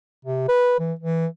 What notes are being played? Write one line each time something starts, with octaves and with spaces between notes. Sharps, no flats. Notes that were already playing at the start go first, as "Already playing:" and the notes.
C3
B4
E3
E3